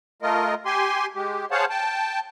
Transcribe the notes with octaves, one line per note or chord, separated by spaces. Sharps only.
A3 F4 A#4 D#5
G4 G#5 C6
G#3 G4
G#4 C5 C#5 F5 F#5 A5
G5 A5